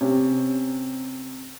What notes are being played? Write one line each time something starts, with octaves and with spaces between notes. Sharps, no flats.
C3 C#4